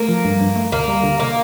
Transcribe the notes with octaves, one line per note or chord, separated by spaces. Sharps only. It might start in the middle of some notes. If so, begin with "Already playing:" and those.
Already playing: A3 A#3
F3
G2
G2
A3
D2 A#3
G3
D3
A#3